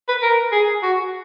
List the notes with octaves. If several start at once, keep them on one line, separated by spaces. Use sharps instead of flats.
B4
A#4
G#4
F#4